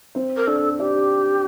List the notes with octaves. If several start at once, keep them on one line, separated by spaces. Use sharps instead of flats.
C4 C5
A#4
D4 A4 D5
D4 G4 D5